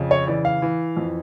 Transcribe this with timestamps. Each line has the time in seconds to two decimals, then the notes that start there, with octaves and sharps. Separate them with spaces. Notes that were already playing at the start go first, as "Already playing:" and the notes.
Already playing: F2 C#3
0.11 C#5
0.27 E3 D5
0.45 F5
0.62 E3
0.97 F2